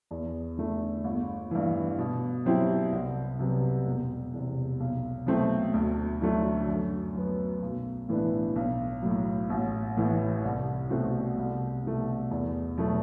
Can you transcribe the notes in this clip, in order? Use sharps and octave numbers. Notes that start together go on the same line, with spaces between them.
E2
D3 A3
G1
G2 E3
B2
F#3 C4 E4 G4
C2
C3 F#3 B3
E1
E2 C3
B1
B2 F#3 A3 C4
D2
D3 F#3 A3 D4
F#2
F#3 B3
B1
A2 E3 B3 D4
B1
A2 F#3
A1
A2 E3
C2
B2 A3 C4 F#4
C2
B2 A3
E2
B2 F#3 A3